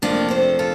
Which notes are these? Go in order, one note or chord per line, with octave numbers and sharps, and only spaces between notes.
F2 C3 F3 A3 A#3 D4
A4 C5
F4 A4